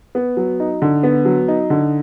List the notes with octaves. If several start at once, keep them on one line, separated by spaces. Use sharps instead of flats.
B3
F#3
D#4
D3
B3
F#3
D#4
D3